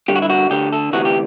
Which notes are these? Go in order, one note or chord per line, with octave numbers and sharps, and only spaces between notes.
G2 D3 G4
F#4
E4
F#4
D2 D3 G4
A4
D2 C3 E3 F#4
G4